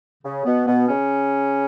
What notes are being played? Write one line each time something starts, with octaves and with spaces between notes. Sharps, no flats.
C#3
B2 B3
B2 B3
C#3 C#4